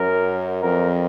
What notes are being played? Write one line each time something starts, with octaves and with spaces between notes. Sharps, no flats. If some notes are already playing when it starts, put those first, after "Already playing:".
Already playing: F#2 A#4
F2 A#4